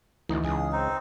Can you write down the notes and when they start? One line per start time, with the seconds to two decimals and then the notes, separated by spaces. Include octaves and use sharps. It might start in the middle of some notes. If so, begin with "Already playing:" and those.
0.29 D2 E3 D#4 D#5
0.44 C#2 G#4
0.72 C4 D#4